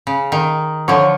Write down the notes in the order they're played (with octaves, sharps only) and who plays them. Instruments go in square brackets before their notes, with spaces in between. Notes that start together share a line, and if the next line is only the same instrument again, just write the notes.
[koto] C#3
D#3
[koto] D3 F3 [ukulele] C#5